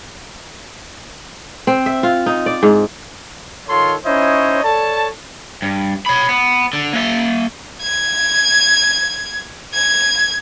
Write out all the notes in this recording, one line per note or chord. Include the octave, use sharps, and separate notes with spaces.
C4
E5
F4
D#4
D5
G#2
D#3 F4 A4 C#5 C6
C#4 D#4 E4 C5 C#5 D#5
A4 C#5 D5 A5
G2
C#5 B5
B3
D3
A#3 E5
G#6
G#6